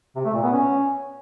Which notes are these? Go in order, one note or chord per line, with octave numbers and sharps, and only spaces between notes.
C3
A3
A#2
B3
C#4